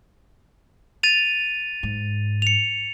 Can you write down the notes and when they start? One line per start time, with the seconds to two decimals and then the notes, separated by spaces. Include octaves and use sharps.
1.03 A6 D#7 F7
1.83 G#2
2.42 C#7 F7